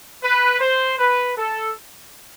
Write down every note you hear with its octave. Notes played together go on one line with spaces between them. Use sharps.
B4
C5
B4
A4